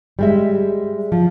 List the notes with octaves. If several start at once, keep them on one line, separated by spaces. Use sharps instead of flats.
G3 G#3 E5
F3